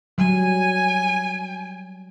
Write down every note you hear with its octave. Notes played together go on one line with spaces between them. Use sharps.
F#3 G3 G#5